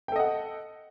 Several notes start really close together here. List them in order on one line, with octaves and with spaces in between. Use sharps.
G5 A4 D#5 F#5